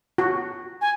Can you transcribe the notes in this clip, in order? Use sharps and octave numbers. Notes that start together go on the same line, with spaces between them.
F#4
G#5